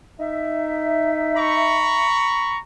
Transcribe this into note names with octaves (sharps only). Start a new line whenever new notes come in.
D#4 E5
A#5 B5 C#6